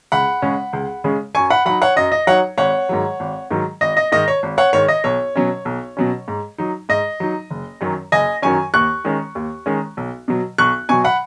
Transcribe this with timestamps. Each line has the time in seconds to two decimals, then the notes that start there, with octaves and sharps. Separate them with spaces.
0.12 C#2 F#5 B5
0.42 C#3 G#3 C#4
0.73 C#2
1.04 C#3 G#3 C#4
1.35 F#2 G#5 C#6
1.50 F#5 B5
1.65 F#3 D#4 F#5 B5
1.82 C#5 F#5
1.96 F#2 D#5
2.12 D#5
2.27 F#3 D#4 C#5 F#5
2.58 G#1 C#5 F#5
2.89 G#2 D#3 F#3
3.20 G#1
3.51 G#2 D#3 F#3
3.81 G#1 D#5
3.97 D#5
4.12 G#2 D#3 D#5
4.28 C#5
4.43 G#1
4.58 C#5 F#5
4.73 G#2 D#3 C#5
4.88 D#5
5.04 B1 C#5
5.36 B2 F#3 C#4
5.65 B1
5.97 B2 F#3 C#4
6.28 G#2
6.58 F#3 D#4
6.89 G#2 D#5
7.20 F#3 D#4
7.50 F#1
7.81 F#2 D#3 F#3 C#4
8.12 F#1 D#5 G#5
8.42 F#2 D#3 F#3 C#4 G#5 C#6
8.74 D#2 C#6 F#6
9.05 D#3 G#3 C#4
9.35 D#2
9.66 D#3 G#3 C#4
9.97 B1
10.28 B2 F#3
10.58 B1 C#6 F#6
10.89 B2 F#3 G#5 C#6
11.04 F#5 B5